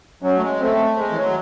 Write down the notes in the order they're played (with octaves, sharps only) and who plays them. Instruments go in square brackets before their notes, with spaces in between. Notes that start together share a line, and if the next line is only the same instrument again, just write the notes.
[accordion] F#3 [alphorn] C#4
[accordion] A3
G#3
[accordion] A3 [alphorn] C4
[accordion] G#3
E3
F#3